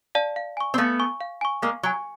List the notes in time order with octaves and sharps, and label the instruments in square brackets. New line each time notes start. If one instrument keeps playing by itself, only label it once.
[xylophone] D5 F5 A5
F5
G#5 C#6
[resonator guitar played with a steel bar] C4
[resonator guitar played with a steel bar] A3 B3 [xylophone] F5
[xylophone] G#5 C#6
F5
G#5 C#6
[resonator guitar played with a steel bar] G#3 A#3 [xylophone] F5
[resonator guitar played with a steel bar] F#3 [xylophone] G#5 C#6